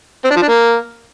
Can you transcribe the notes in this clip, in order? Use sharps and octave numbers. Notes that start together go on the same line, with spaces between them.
C4
D4
F3
D4
A#3